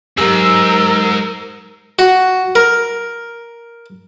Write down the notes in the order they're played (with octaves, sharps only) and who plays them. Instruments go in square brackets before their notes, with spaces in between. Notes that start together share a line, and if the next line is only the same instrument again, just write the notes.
[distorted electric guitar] F2 G#2 [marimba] F#3 G4 [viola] A#4 [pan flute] E6
[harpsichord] F#4
A#4